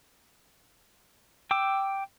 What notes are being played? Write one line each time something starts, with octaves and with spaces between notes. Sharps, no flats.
G5 D6 E6